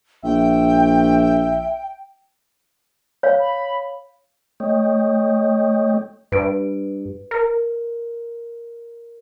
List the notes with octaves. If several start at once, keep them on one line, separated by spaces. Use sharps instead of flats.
A#1 E5 G5
C#5 F5
B5
A3 C#5 D#5 G5
G2 B4 D7
A#4